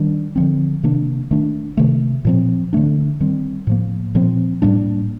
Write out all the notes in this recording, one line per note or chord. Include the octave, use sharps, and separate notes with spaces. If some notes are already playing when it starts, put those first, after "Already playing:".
Already playing: D#3 G3 D4
D3 F3 C4
C3 D#3 A#3 D4
D#3 A3 D4
C3 D#3 A3
A#2 F3 C4
D3 A3 D4
D#3 G3 C4
A2 F3 A#3
A#2 F3 C4
A2 G3 A#3 D4